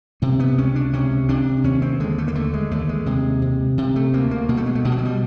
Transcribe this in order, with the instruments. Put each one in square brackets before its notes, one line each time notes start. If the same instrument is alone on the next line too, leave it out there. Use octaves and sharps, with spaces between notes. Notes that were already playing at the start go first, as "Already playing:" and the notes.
[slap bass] C3 C#4
B3
C#2 C#4
D4
C3 C#4
C3 D4
D#2 C#4
C4
D3 G#3
A3
A#3
D3 A3
G#3
D#2 A3
G#3
C3 G#3
C3
C3
A3
D2 A#3
A#3
B2 A#3
A3
G#3
A3
B2 G#3
G3
F#3
G3